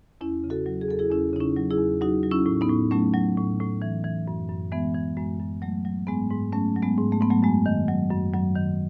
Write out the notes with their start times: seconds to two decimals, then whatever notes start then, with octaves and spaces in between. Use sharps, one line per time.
0.21 E2 C#4 E4
0.44 C#3
0.50 F#4 A4
0.66 F#3
0.81 G#4
0.89 E2 A4
0.99 E4 G#4
1.10 E2 C#4 E4
1.33 C#3 D#4
1.40 C#4 E4
1.57 F#3
1.71 E4 G#4
1.78 E2
2.01 F#3 D#4 F#4
2.23 F#3
2.31 C#4 E4
2.46 A2
2.61 B3 D#4
2.70 A2
2.91 F#3 A3 C#4
3.14 F#3
3.37 A2
3.60 A2
3.82 E3
4.04 E3
4.28 F#2
4.49 F#2
4.72 E3 G#3 B3
4.94 E3
5.17 F#2 G#3
5.40 F#2
5.62 F#3 A3
5.85 F#3
6.07 G#2 G#3 B3
6.30 G#2
6.52 F#3 A3 C#4
6.76 F#3
6.82 G#3 B3
6.98 G#2
7.12 A3
7.21 G#2 B3
7.30 F#3 A3
7.43 F#2 G#3
7.66 D#3
7.88 F#3
8.11 F#2
8.34 F#2 F#3
8.55 D#3